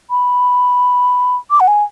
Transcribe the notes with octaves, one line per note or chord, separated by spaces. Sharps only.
B5
D6
F#5
G#5